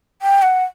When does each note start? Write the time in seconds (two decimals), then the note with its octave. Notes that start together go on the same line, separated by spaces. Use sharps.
0.22 G5
0.42 F#5